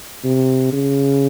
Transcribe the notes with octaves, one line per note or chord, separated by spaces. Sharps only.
C3
C#3